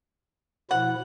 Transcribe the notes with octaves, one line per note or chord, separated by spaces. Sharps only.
B2 F3 E4 F#5